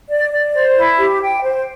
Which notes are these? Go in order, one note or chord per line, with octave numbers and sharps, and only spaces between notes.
D5
D5
C5
E4
G4
G5
C5